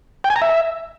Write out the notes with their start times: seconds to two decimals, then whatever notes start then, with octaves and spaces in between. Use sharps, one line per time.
0.24 G5
0.30 G#5
0.36 A#5
0.42 E5